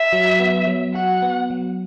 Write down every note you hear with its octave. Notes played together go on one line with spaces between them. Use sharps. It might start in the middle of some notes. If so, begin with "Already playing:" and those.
Already playing: E5
F#3
B3
F#3
F#4 F#5
B3
F#3